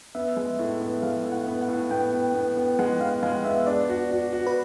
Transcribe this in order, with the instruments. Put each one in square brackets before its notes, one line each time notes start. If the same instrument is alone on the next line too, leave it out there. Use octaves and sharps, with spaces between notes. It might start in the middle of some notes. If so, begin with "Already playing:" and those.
[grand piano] B3 [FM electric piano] E5
[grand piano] G#3
A2
B3
[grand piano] G#3 [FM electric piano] F5
[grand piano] A2
[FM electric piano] F#5
[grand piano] B3
[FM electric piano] F#5
[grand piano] A2
[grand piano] B3 [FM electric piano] G5
[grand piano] B3
B3
B3
[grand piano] G#3 [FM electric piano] F#5
[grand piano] B3 [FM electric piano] F5
[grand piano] G#3 [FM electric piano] F5
[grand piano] B3 [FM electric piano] E5
[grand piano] D4 [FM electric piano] D5
[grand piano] F#4
F#4
F#4
[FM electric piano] B4